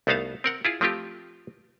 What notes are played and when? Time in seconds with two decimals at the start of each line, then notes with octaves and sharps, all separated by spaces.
0.07 C2 A3 B3 D#4 F5 A5
0.44 C4 A#4 F#5
0.65 E4 F4 G#4
0.81 F3 A3 C4 F4 G4